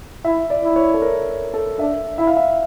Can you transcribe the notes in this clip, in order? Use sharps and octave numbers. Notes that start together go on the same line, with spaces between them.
E4 E5
D5
E4
C#5
A4
A#4
A4
D4 E5
E4 E5
F5
E5